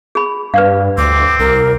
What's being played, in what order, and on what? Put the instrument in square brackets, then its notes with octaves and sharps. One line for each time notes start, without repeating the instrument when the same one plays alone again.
[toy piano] G#4 B5
[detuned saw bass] G2 [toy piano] B4 D5 F5
[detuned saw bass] D2 [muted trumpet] C4 [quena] D6
[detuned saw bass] C2 [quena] A#4